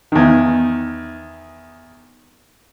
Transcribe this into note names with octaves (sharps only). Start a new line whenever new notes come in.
E2 D#3